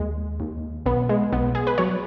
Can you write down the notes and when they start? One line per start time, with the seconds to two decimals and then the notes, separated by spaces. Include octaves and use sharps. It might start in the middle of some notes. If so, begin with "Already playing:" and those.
Already playing: D#2 G#3
0.40 D#2
0.86 B1 B3
1.09 G#3
1.32 B1 B3
1.55 G#4
1.67 B4
1.78 F#3 C#5